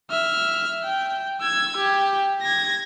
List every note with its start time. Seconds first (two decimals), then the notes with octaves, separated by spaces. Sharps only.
0.11 E5 F6
0.83 G5
1.41 E6 G#6
1.77 G4
2.42 G#6 A#6